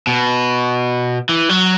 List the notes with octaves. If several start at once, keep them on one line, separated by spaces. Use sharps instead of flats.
B2
E3
F#3